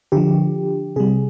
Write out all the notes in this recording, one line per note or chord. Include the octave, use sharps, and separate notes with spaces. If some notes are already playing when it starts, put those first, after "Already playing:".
D3 F3 G4
C3 G3 G#4